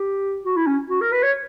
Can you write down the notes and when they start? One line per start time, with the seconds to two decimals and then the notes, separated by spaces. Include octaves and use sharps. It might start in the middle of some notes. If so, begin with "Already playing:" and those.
Already playing: G4
0.45 F#4
0.57 E4
0.67 C#4
0.90 F#4
1.01 A#4
1.12 B4
1.23 C#5